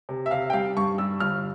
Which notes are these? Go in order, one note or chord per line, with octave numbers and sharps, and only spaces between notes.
C3
E5
C3 F5
G5
G3 F5
G2 C#6
G3 E6
G1 F6